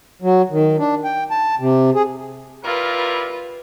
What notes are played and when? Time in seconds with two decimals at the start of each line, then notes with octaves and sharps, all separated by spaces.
0.22 F#3
0.50 D#3
0.79 D4
1.05 G5
1.31 A5
1.59 C3
1.95 G#4
2.64 G3 E4 F4 A#4 B4